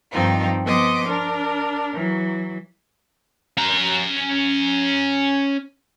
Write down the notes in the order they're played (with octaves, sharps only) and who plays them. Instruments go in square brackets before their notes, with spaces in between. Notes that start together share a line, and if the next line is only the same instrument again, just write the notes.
[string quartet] G2 D#3 F3 C4 D#4 F4
F3 B3 D#5 C6 D6
D4 A#4
E3 F#3
[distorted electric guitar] C#4 A#5